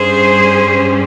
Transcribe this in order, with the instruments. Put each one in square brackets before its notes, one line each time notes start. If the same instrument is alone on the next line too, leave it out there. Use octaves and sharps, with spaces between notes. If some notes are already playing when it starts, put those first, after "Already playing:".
Already playing: [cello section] G2 G3 C#4 G#4 C5